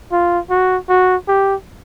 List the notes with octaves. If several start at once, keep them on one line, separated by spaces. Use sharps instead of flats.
F4
F#4
F#4
G4